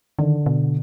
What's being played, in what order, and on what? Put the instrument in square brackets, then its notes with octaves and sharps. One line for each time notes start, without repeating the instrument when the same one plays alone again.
[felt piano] D3 [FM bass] D#3
[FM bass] B2